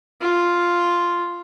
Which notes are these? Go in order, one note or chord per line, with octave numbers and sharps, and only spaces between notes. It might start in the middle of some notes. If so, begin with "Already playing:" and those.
F4